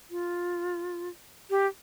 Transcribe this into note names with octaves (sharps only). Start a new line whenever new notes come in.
F4
G4